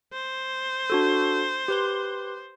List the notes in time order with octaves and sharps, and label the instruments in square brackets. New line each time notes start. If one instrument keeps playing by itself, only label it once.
[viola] C5
[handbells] D4 F#4 A4
G4 B4 C6